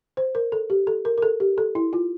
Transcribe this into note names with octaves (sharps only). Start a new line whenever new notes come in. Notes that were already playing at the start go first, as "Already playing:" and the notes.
C5
A#4
A4
G4
A4
A#4
A#4
A4
G4
A4
E4
F4